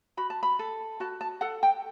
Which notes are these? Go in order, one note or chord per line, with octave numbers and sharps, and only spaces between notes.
F#4 B5
A5
B5
A4
F#4 A5
A5
A4 F#5
G5